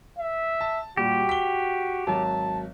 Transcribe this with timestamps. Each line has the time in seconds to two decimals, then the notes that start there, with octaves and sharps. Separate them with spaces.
0.19 E5
0.61 A5
0.97 A#2 G3 F#4 G4
1.29 B6 G7
2.07 G#1 F#3 A5